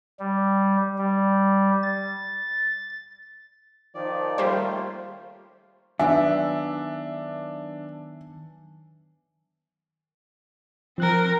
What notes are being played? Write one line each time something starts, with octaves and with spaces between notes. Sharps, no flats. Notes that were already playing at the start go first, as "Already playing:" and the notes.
G3
G3
A6
D#3 F3 D5
G3 A3 A#3 F4 C5
D#3 F#3 B3 D4 E5 G#5
F3 C4 A#4 F#6